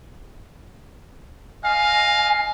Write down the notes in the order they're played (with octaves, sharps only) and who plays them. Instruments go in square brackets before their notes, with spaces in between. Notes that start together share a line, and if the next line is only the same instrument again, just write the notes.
[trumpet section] D#5 F5 [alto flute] G#5